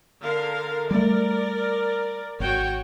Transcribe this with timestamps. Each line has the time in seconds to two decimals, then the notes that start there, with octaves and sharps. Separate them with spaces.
0.21 D3 A#4 F5
0.91 G3 A3 A#4 D5
2.40 G#1 F#4 C#5 G5